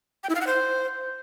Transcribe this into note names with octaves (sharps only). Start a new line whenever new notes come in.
G5
E4
F5
F#5
C5